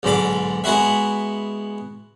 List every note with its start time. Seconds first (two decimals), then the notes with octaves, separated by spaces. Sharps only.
0.03 B1 G#2 D3 B5 D6
0.64 G#3 B3 E4 F#4 E5